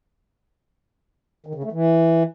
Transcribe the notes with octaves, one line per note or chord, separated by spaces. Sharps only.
D#3
C#3
A3
E3